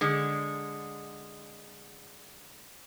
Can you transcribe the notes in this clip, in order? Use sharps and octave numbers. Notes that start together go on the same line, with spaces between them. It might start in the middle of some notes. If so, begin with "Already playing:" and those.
D3 G#3